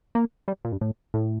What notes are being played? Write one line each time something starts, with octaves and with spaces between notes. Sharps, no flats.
A#3
G3
A#2
G2
A2
A2